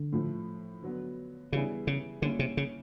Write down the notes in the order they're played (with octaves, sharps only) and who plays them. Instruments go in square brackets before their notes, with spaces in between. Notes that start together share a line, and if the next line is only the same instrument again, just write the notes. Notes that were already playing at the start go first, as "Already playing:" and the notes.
Already playing: [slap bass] D3
[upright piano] A2 F3 A3
D3 F#3 B3
[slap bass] C#3 [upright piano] E3 G3 B3 E4 G#4
[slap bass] C#3
[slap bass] D3 [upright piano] G3 A#3 C#4 E4
[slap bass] C3
C#3